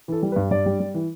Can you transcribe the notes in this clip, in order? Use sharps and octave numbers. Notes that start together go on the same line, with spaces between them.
E3 A4
G3
B4
G2
G2 D5
G3
G3
E3